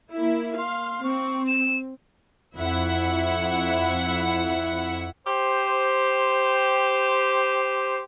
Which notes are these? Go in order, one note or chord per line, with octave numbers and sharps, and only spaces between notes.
A#3 E4
F5 C6
C4 C#6
E7
F2 E4 E5 F#5
G4 C5